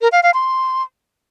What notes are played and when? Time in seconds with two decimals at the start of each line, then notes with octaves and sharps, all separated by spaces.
0.01 A#4
0.12 F5
0.23 F5
0.34 C6